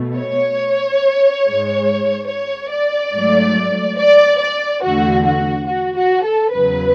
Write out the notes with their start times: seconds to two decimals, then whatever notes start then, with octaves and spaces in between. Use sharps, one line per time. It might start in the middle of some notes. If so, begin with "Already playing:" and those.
Already playing: B2 A3
0.17 C#5
1.45 G#2 G#3
2.29 C#5
2.71 D5
3.13 G#2 F#3 A3
3.98 D5
4.40 D5
4.83 E2 D3 A3 F#4
5.25 F#4
5.66 F#4
5.96 F#4
6.24 A4
6.51 E2 C#3 F#3 B4